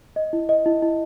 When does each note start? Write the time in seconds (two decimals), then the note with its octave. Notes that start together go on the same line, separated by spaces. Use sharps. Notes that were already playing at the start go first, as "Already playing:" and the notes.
0.16 D#5
0.33 E4
0.49 D#5
0.66 E4
0.82 E4